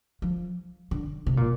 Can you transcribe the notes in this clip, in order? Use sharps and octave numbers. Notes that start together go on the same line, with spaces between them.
F3
D3
C3
A#2